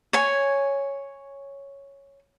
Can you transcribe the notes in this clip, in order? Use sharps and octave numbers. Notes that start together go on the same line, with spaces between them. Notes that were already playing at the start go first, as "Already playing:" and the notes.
C#5 G#5